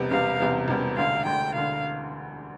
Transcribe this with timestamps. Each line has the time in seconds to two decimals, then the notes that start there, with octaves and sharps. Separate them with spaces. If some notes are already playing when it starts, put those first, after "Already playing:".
Already playing: E1 E2 C3 G3 B3
0.11 E1 E2 C3 G3 B3 F5
0.39 E1 E2 C3 G3 B3
0.68 E1 E2 C3 G3 B3
0.97 E1 D2 D3 F5
1.25 E1 D2 D3 G5
1.54 E1 D2 D3 F5